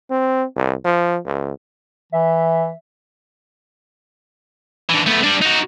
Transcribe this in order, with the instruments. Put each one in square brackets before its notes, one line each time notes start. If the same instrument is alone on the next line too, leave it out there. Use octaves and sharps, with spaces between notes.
[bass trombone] C4
C2
F3
C#2
[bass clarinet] E3 [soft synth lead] E5
[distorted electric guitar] D3 E3
A3 B3
G3 D4
D#4 F#4